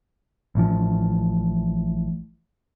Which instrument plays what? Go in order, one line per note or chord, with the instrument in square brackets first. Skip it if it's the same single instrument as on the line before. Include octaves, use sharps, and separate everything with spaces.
[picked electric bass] A1 A2 F3